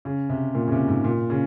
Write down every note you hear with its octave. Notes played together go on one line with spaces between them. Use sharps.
C#3
C3
A#2
C#3
C3
G#2
A#2
C#3